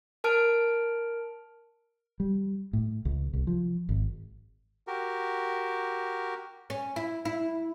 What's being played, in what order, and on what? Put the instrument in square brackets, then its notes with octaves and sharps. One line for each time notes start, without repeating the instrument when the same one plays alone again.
[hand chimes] A#4 A5 F6 D7
[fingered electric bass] G3
A2
C#2
C2
F3
G#1
[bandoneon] F#4 G4 A#4
[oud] C#4
E4
E4